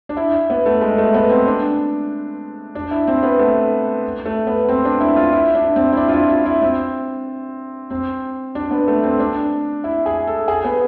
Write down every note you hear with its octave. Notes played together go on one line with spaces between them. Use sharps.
D4
E4
B3
A3
G#3
A3
B3
C4
D4
D4
E4
C4
B3
A3
A3
B3
C4
D4
E4
F4
E4
D4
C4
E4
D4
F4
E4
F4
E4
C4
C4
D4
B3
A3
C4
D4
E4
G#4
A4
G#4
B3